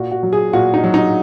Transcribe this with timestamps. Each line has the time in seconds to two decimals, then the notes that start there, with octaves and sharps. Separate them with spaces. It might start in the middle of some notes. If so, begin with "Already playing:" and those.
Already playing: A#2 F#4
0.11 F#4
0.23 F#3
0.33 G#4
0.53 A#2 F#4
0.74 D#4
0.84 F#3
0.94 D#4